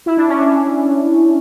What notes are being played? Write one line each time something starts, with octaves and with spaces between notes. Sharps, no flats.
E4
D4
C#4
D4